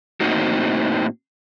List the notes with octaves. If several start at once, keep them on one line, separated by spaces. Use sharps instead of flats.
A2 A#3 C4 D#4 F#4